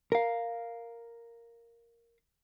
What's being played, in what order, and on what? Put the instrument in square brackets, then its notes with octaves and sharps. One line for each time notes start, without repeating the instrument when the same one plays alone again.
[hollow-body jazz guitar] A#4 F5